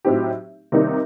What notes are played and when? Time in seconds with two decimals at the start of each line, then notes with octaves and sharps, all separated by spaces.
0.05 A2 F#3 C4 D#4 G4
0.72 C3 D#3 G3 A#3 D#4